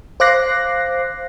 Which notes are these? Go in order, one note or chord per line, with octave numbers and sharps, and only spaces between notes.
C5 F5 D6 F#6 A#6 C7